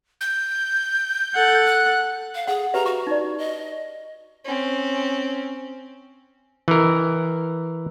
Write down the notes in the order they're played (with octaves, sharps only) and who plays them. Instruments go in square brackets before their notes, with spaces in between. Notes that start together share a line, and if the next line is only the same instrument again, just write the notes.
[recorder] G6
[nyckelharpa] A4 F#5
[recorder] F#6
[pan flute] F5
[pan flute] G#4 [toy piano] F#5
[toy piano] G4 B4 E5 [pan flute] A#5
[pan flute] F#4 [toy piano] C#6
[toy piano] D#4 D5
[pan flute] D#5
[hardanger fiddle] C4 C#4
[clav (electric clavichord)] E3 A#4